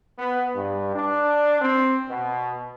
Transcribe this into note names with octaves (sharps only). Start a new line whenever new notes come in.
B3
G2
D4
C4
B2